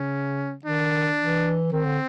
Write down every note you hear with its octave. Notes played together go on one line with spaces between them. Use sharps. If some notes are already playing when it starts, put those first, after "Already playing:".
Already playing: C#3 C#4
D#3 D4
E3
D#3 C4
D3